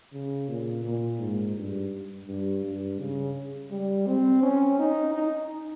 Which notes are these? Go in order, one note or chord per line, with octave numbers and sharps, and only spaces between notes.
C#3
A#2
A#2
G#2
G2
G2
G2
C#3
G3
C4
C#4
D#4
D#4